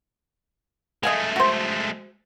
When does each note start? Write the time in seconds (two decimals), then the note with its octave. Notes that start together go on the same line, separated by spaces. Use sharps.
1.03 G#3 A3 D#5 F5 G#5
1.36 F#4 C5